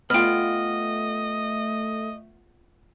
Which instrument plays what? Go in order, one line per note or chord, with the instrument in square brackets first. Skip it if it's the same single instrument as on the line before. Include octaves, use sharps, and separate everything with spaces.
[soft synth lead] A3 [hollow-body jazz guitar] B3 F4 [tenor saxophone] D#5 [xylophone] G5 F6